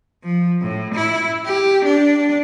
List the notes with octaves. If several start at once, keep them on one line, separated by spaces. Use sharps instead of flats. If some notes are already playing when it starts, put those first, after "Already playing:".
F3
A2
E4
G4
D4